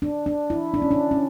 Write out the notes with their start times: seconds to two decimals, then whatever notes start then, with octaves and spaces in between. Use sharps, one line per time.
0.02 D4
0.26 D4
0.50 E4
0.74 D4
0.82 C#4
0.91 D4
1.11 C#4